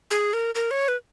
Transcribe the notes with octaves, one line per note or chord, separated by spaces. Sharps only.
G#4
A#4
A#4
C#5
B4